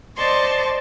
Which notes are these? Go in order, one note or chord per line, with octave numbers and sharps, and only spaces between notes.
C5 D5 D#5 A5 C6 C#6